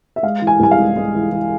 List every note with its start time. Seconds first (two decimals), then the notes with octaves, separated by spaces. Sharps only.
0.16 E5
0.23 G#3 F5
0.42 E3
0.47 G#5
0.60 C2 G#5
0.71 F5
0.78 G#3
0.96 G#3
1.14 E3
1.31 E3